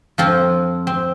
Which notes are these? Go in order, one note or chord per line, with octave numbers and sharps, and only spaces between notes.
F2 F3 C4 F4
C4